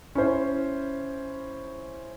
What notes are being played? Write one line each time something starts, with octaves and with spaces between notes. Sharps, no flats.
C#4 E4 C5